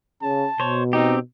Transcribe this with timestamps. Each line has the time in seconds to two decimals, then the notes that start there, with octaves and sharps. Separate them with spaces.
0.22 C#3 A5
0.60 B2 C5 C#5
0.93 C4 D#4 G4